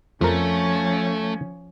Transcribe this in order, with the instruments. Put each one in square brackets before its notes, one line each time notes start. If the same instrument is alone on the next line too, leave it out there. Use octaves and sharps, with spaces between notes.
[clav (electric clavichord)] F2 A#4 [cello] F3 C#4 [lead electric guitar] A3